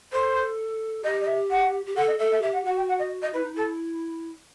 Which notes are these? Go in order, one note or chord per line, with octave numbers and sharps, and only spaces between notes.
A4 C5
G4 D#5
D#5
E5
F#5
G4
A4 F#5
D#5
A4 E5
E5
G4 E5
F#5
F#4 F#5
G5
F#5
D#5
D#5
E4 B4
D#4
E4 A4